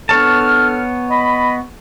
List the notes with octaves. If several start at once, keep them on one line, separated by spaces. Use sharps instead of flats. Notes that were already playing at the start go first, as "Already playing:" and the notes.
B3 D4 A4 C#5 A5 F6
D#5 B5